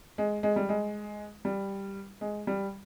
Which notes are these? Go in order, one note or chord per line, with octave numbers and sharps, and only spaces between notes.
G#3
G#3
G3
G#3
G3
G#3
G3